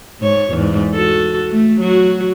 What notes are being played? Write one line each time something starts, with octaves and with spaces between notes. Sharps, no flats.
G#2 C#5
E2 G#2
F#4 A4
A3
F#3 F#4